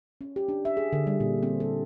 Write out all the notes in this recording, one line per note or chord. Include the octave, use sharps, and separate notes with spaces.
C#4
G4
D4
E5
G#4
D3
G3
A#2
C4
A4